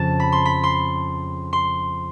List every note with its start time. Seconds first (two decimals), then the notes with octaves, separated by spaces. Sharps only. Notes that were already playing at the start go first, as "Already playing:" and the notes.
Already playing: F2 C#3 F3 A5
0.20 B5
0.32 C6
0.45 B5
0.63 C6
1.53 C6